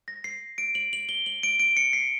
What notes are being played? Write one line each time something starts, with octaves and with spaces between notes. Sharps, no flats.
A#6
C7
D7
F#7
F#7
G7
F#7
D7
D7
C#7
C7